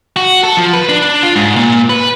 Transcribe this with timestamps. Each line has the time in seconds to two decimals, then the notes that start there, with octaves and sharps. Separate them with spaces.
0.16 F#4
0.44 A4
0.57 F3
0.73 B4
0.89 D4
1.23 F4
1.36 G#2
1.56 A#2
1.90 B4